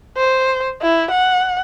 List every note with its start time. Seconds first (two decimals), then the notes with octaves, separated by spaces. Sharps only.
0.17 C5
0.82 E4
1.11 F#5